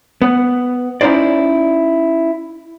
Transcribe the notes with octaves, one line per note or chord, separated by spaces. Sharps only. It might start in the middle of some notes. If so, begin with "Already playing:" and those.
B3
C#4 D#4 E4 C5 D5